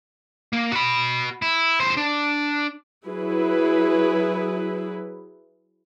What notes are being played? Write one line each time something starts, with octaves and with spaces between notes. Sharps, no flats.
A#3
F#4 B5
E4
E2 C5
D4
F#3 E4 G#4 B4